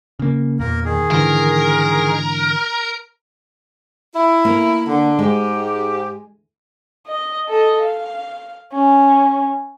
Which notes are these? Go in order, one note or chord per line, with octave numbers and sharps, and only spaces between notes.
C#3 A#3
E2 A#2 A#3 A#4
D#3 G#4
G#2 D3 E3 A#4
E4
A#3 A#4
D3
G#2 G#3 G4
D#5
A4 D#5
F5
C#4